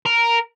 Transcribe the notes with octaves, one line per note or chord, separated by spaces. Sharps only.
A#4